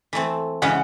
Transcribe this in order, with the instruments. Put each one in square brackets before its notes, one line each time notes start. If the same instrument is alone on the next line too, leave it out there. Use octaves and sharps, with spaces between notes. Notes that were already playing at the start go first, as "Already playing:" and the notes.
[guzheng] E3 A3 C4
[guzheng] C#3 E3 G#3 C#4 [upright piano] F#5